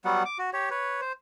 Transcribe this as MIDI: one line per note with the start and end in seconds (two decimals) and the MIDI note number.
0.05 0.23 54
0.05 0.23 55
0.05 0.23 59
0.05 0.23 78
0.25 0.38 86
0.38 0.50 66
0.53 0.69 67
0.53 0.69 73
0.70 1.01 71
0.70 1.01 73
1.01 1.12 72